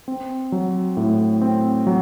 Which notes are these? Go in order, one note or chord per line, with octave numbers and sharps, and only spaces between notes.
C4
F#3
A2
C4
F#3